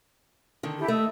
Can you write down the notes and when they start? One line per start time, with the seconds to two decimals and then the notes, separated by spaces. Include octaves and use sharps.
0.63 D3 D#3
0.77 E4 G4 A4
0.88 A3 D#5 E6